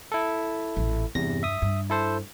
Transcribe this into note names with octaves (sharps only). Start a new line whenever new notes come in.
E4 A4
A1 A#2
E2 G2 C3 A#6
E5 D#6
G2
E4 A4 C5